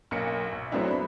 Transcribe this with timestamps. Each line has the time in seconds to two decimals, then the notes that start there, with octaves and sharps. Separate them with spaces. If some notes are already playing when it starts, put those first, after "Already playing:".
0.11 B1 A#3 C#7
0.52 B1
0.72 F#3 A3 B3 C4 D4 E4
0.91 B5